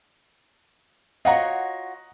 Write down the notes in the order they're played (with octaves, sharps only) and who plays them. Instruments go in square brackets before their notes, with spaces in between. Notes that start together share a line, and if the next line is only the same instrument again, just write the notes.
[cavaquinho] F4 F#4 C#5 [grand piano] D#5 F#5 A#5